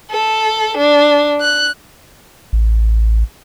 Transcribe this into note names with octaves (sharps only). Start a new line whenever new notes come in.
A4
D4
F#6
A1